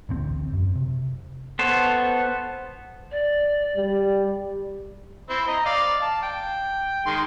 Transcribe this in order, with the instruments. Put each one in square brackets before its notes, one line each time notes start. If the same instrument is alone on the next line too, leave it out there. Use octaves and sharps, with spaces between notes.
[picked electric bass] A1 D2 C4
F#2
C3
[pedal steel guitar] B3 A4 C5 C#5
[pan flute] D5
[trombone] G3
[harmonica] C4 E4
D#5 A#5
D5 F5
A5
G5
D#3 G#3 C6